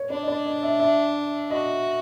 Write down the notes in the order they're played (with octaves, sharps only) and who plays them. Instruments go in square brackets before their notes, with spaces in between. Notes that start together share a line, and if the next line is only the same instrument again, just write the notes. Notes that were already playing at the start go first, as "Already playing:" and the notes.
Already playing: [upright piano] C#5
[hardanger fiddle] D4 [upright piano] C#5
[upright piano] D#5
D5
D#5
E5
E5
[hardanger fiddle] F#4 [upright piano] D#5